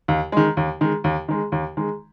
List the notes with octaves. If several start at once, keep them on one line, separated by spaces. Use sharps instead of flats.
D#2
D#3 G#3
D#2
D#3 G#3
D#2
D#3 G#3
D#2
D#3 G#3